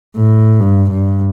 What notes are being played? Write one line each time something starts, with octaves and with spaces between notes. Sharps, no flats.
A2
G2
G2